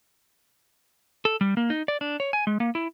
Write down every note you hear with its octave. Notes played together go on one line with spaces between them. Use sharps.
A4
G3
A#3
D#4
D5
D4
C#5
G#5
G#3
A#3
E4